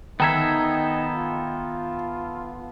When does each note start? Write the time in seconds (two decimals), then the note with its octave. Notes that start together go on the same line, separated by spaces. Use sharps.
0.20 D#3 B3 D#4 A4 E5 G5 A#5 G#6
1.14 F4